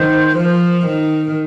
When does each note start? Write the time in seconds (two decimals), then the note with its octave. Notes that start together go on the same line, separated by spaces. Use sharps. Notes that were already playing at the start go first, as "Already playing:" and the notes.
Already playing: D#3 C5
0.35 F3 A#4
0.45 C5
0.52 A#4
0.87 D#3 A#4